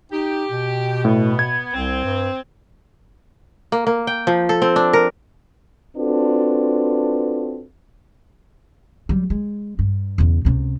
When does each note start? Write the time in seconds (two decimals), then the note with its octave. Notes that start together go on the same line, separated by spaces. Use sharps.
0.12 D#4 G4
0.50 B2
1.05 A2 B3
1.39 G#6
1.74 C2 C4
2.04 G2
3.72 A#3
3.87 A#3
4.07 G5
4.27 F3
4.49 A4
4.62 C4
4.76 D4
4.93 A#4
5.97 C4 D4 F4 F#4 A4 B4
9.09 F#3 G3
9.30 G#3
9.79 G2
10.18 E2 C#3
10.45 C#2 C3